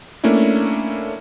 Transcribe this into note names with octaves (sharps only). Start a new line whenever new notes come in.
A3 A#3 C#4 D4 E4